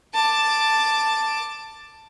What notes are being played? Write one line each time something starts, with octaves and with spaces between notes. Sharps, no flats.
A5 D6